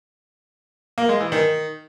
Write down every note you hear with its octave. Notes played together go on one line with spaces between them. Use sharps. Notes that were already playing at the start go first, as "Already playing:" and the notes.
A#3
G#3
E3
D#3